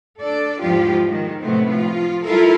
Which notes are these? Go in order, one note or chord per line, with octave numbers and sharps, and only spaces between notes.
D4 A4 D5
E2 G#2 F3 G#3 F4 G4
D#3 G#3
A2 C3 F#3 A3 B3 C4
F3 F4
G3 E4 F4 A4 A#4